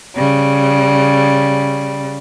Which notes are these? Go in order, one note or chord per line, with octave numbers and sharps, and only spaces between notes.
C#3 G3